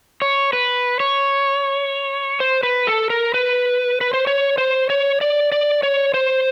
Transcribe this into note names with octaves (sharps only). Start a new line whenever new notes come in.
C#5
B4
C#5
C5
B4
A4
A#4
B4
B4
C5
C#5
C5
C#5
D5
D5
C#5
C5